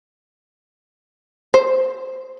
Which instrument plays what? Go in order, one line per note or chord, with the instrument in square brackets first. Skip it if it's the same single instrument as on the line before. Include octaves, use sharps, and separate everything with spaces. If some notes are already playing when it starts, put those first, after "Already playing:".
[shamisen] C5